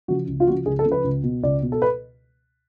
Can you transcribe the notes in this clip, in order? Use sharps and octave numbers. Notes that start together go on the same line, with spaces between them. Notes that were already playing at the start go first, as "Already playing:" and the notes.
C#3 F3 F#4
C#2
F4
C#3 F3 F#4
C#2 G#4
A4
C#3 F3
B4
C#2
B2
C#2 D5
B2
A4
B4